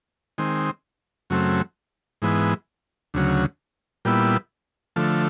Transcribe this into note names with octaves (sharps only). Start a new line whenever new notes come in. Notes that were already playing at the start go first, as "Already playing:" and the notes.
D#3 G#3 C4
F#2 C#3 F#3 A3 C4
G#2 E3 G#3 B3
D2 C#3 F#3
A#2 G3 B3 E4
D3 F3 A3